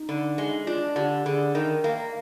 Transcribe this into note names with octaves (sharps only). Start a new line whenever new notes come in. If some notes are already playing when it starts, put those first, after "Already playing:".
Already playing: D#4
D3
G#3
D4 F4
D3 G4
D3 G#4
D#3 A#4
A#3